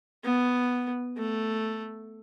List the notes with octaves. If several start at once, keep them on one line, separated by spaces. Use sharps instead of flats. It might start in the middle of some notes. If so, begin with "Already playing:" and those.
B3
A3